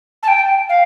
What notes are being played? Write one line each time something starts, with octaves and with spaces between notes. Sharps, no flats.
A5
G5
F5